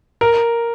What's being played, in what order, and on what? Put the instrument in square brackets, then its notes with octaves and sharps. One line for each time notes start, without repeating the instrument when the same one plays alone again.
[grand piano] A#4